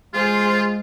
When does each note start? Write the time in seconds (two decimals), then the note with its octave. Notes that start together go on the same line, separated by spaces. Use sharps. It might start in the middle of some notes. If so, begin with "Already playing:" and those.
0.14 G#3 F4 G#4 C5